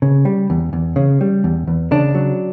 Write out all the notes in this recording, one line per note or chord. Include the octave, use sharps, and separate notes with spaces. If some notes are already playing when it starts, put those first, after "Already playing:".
C#3
G3
E2
E2
C#3
G3
E2
E2
C#3 D4
F#3